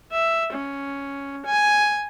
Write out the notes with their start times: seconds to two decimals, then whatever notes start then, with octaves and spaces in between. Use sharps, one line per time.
0.12 E5
0.53 C#4
1.46 G#5